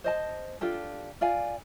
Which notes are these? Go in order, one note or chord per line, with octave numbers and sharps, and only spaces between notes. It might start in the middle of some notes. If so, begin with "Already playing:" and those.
C5 D#5 A5
D4 F4 G4 A4
F4 D5 F5 G#5